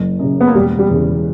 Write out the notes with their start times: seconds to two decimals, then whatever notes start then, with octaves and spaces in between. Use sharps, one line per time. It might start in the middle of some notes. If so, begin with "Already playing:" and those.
Already playing: F#1
0.19 F#2 C#3
0.41 B3
0.47 A#3
0.55 E1 G3
0.79 G3
0.91 E2 C#3